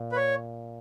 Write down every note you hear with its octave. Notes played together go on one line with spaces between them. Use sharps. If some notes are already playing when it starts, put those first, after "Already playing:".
Already playing: A#2
B4
C#5